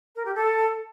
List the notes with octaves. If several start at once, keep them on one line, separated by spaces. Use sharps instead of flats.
A#4
G4
A4